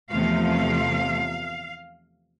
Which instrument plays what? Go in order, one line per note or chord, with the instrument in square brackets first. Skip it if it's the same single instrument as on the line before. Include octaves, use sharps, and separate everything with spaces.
[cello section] E2 C3 F3 A3 F5